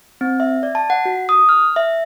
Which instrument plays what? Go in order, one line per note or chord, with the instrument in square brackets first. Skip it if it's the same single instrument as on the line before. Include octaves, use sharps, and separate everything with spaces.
[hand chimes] C4
E5
D5
A5
F#5
F#4
D#6
F6
E5